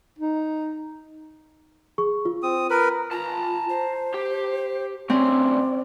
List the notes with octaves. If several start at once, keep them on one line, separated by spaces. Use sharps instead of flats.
D#4
G#4 C#6
F4
C4 D#6
A#4 B4 B5
F4 A5 A#5
C5
G4
D2 C4 C#4 D5